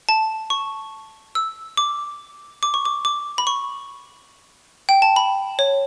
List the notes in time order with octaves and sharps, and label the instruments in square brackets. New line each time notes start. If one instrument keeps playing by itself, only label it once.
[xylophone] A5
C#6
E6
D6
D6
C#6
D6
D6
B5
C#6
G5
A5
B5
C#5